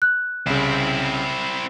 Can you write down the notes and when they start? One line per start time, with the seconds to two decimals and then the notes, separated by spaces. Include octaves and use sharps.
0.02 F#6
0.46 C2 C#3 C4 E4